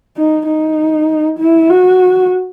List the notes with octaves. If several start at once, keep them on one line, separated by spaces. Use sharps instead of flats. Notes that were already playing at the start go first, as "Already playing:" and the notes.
D#4
D#4
E4
F#4